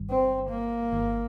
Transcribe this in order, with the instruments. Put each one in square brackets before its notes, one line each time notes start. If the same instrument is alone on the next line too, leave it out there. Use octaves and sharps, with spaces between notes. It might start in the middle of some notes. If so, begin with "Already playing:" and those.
Already playing: [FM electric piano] G1 G2 D#3 G3
[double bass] C4
A#3
[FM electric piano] G1 G2 D#3